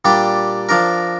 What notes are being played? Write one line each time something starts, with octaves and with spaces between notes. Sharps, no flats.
A#2 G3 D4 G4
F3 D4 A#4